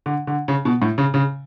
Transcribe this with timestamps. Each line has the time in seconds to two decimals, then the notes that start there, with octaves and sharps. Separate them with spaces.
0.06 D3
0.27 D3
0.48 C#3
0.65 B2
0.82 A2
0.98 C#3
1.14 C#3